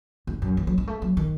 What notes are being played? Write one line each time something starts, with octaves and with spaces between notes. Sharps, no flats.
E2
F#2
E3
F#3
G#3
A3
F#3
D#3